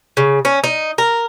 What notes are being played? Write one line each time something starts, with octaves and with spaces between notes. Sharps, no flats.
C#3
C#4
D#4
A#4